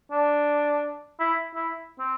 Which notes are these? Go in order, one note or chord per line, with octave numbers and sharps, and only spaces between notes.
D4
E4
E4
C4